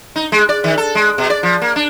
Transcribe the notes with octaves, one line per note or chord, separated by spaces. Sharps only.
D#4
G#3
D5
D#3
A4
G#3
B2
D5
F3
A#3
D4